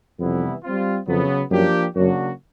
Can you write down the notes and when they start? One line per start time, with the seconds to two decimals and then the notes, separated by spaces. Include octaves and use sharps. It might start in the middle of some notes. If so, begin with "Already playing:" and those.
0.19 F2 C3 E3 G3 B3 E4
0.63 G3 C4 F4
1.07 F2 C#3 F#3 B3
1.51 F#2 F3 A#3 D4 G4
1.95 F#2 C#3 F#3 A#3 D4 F#4